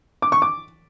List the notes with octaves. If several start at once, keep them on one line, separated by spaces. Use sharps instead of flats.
D6
C#6
D6